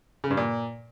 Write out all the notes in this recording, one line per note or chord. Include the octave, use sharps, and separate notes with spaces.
C#3
G2
A#2